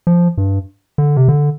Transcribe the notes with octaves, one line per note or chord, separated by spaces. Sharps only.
F3
G2
D3
C3
D3